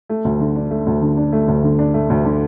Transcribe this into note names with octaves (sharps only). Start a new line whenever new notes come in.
A3
D2
D3
D4
A3
D2
D3
D4
A3
D2
D3
D4
A3
D2
D3